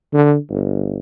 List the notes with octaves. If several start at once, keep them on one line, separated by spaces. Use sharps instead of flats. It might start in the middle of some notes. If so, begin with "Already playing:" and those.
D3
G1